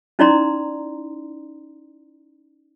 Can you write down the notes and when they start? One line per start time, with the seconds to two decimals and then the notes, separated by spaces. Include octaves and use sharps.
0.19 C#4 D#4 E4 D5 A#5 C6